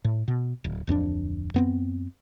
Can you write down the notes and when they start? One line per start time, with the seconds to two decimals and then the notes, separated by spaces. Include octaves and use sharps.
0.04 A2
0.28 B2
0.64 D1
0.87 D1 F2 C#4 D4
1.54 F#2 B3 C4